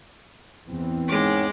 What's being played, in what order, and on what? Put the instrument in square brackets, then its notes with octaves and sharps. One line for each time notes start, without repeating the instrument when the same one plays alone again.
[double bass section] E2 E3 C4
[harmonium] G#2 D#3 C#4 [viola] G#3 D6